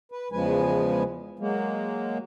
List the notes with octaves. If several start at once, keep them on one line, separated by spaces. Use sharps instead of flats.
B4
E2 C#3 F3 G#3 B4 G#5
F#3 G#3 A#3